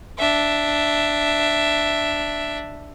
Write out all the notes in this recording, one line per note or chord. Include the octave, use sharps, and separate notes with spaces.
D4 E5